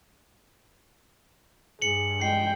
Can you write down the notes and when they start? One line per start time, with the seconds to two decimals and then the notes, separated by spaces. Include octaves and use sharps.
1.82 G2 G#4 C#7 F#7
2.22 G#3 G5 C7